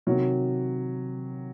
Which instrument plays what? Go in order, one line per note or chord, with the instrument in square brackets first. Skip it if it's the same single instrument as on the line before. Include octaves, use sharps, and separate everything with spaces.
[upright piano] C3 D#3 F#3